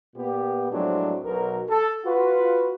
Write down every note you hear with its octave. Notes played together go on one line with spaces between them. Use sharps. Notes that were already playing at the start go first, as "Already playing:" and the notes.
A#2 B3 G4
A2 F3 F#3 G#3 C4 D4
B1 B2 A#4
A4
F4 F#4 B4